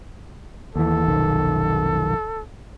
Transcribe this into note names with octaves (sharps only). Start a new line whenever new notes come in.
D#2 E3 A4
F1 B1 D#3